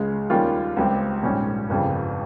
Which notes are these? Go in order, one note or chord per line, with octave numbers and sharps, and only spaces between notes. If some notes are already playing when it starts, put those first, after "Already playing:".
Already playing: C#2 C#3 G#3
D#2 D#3 G3 C#4 F4
C#2 C#3 G3 C4
A#1 G#2 G3 C#4
G1 F2 C#3 G3